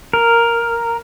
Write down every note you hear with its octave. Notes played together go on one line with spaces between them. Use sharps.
A#4